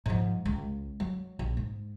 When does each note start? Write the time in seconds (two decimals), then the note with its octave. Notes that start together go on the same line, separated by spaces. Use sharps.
0.06 G#2 F3
0.46 C#2
1.00 F#3
1.39 A#1
1.57 G#2